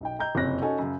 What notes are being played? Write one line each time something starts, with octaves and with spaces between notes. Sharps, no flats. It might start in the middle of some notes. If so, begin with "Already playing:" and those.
B1 D#4 G5
D#5 G5 A#5 G6
F#1 F2 C3 C#5 F#6 A#6
C#4 D#4 F#4 A4 D#5 G#5
F#2 C#3